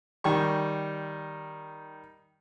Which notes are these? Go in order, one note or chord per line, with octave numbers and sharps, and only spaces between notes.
D#3 G3 C#6